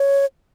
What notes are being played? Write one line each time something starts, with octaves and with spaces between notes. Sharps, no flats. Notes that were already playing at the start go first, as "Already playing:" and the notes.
Already playing: C#5